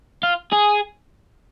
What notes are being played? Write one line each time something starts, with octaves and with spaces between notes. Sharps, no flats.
F4
G#4